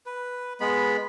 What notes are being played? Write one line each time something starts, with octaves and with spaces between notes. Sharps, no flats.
B4
G#3 B3 B5